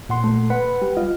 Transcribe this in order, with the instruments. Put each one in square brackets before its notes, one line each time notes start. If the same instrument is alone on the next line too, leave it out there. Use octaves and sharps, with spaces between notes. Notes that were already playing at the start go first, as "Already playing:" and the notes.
[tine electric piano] A#2 F#5 C6
[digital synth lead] A3
[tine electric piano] B4 F#5 [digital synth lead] B5
[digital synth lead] G3
[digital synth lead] F4 [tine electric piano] D#5